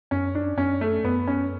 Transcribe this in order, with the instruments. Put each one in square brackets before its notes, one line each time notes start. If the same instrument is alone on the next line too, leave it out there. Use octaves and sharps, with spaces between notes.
[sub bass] F#2 [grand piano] C#4
[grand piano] D4
[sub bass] F#2 [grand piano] C#4
[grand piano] A3
[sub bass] F#2 [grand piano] B3
[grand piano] C#4